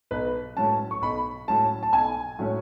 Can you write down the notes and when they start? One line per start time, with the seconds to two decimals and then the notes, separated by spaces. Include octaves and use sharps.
0.11 B1 B4
0.57 A2 F#3 C#4 A5
0.91 C#6
1.02 B1 B5
1.48 A2 F#3 C#4 A5
1.83 A5
1.93 B1 G#5
2.39 A2 F#3 C#4